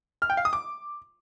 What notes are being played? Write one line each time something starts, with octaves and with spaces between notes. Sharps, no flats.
F6
G5
F5
D#6
D6